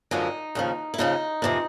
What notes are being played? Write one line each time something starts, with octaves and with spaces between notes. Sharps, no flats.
F#2 D3 F3 G#3 D#4
D#2 C#3 F3
E4
D#2 C#3 F3 D#4
F2 C3 E3